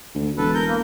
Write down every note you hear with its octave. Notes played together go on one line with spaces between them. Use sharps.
D2
E1 A4 B4
A#4 G6
A#3